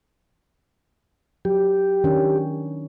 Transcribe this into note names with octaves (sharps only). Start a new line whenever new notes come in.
F#3 G4
D#3 C#4 D4